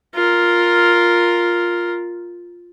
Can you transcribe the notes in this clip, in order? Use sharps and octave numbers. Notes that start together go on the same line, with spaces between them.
F4 A#4